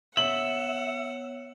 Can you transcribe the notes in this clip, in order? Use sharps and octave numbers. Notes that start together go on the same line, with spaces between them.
B3 C#5 E5 F#5 F#7